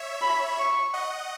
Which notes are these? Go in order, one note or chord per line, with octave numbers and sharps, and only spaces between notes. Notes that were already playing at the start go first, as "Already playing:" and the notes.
Already playing: C#5 E5
B5
C#6
D#5 F#5